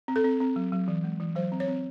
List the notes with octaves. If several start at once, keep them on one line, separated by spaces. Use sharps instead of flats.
C4
A4
C4
C4
F#3
F#3
E3
G#3
E3
F#3 C5
C4
C#5
C4